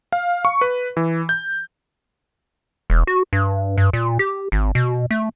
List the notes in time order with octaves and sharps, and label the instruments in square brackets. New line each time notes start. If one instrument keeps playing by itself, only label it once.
[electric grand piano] F5
C#6
B4
E3
G6
[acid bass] E1
F#4
G2
G2
A#2
G4
G#1
B2
A3